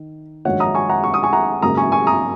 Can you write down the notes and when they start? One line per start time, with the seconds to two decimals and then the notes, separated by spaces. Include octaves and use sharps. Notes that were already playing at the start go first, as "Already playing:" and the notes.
Already playing: D#3
0.45 A#1 G#2 D#3 F#3 C#5 F#5
0.60 A#5 D#6
0.75 G#5 C#6
0.89 F#5 A#5
1.04 C#6
1.14 D#6
1.23 G#5 C#6
1.33 F#5 A#5
1.62 G#1 F#2 C#3 A#3 A#5 D#6
1.77 G#5 C#6
1.92 G#5 C#6
2.07 A#5 D#6